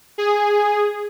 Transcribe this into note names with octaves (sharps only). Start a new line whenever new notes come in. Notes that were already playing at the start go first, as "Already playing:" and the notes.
G#4